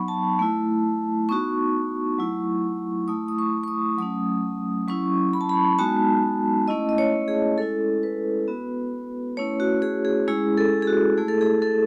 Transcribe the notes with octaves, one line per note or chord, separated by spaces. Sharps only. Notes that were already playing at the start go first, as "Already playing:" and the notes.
Already playing: F#3 B3 D#4 B5 C#6
A5
A3 E4
B3 D#4 F#4 C#6
F#3 A3 E4
A3 E4 D#6
D#6
C#6
C#6
D#6
F#3 A3 C#4 D#6
F#3 C#4 E4 C#6
B5
A5
B5
G#3 B3 D#4 F#4 A5
A3 C#4 E4 D#5
D#5
C#5
G#4
G#3 C#4 E4 A4
B4
B3 F#4
A3 C#4 E4 C#5
F#4
G#4
G#4
G#3 C#4 E4 G#4
A4
G#4
F#4
A3 E4 G#4
A4
G#4
A4